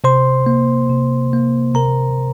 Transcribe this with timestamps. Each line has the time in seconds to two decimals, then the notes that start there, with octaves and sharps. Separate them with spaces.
0.04 C3 C5 C6
0.46 A#3
0.89 C3
1.33 A#3
1.75 C3 A#4 A#5